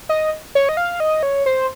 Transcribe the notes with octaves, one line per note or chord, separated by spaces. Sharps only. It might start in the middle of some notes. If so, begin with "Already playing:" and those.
D#5
C#5
D#5
F5
D#5
C#5
C5